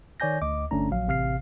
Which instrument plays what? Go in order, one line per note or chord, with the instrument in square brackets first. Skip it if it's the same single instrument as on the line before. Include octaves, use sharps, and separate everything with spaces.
[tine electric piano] D#3 C#5 D5 G#5 G6 A#6
D2 D#5 D6
G1 D3 A3 C#4 D4 A#5
A#1 F#3 F5
A1 C3 F5 F6 C7